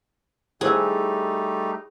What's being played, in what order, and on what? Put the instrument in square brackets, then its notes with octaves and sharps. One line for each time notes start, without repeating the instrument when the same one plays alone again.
[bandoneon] G3 A3 D#4 [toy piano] E4 C5 E6 [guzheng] G#4